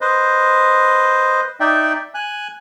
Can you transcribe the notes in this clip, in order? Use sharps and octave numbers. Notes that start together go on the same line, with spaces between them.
B4 C5 D#5
D#4 D5 E5 G5
G#5 F#6